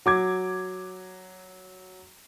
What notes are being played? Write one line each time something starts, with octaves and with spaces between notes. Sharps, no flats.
F#3 D6 G#6